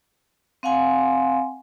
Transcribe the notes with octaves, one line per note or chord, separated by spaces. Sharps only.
C4 F5 F#5 G#5 C6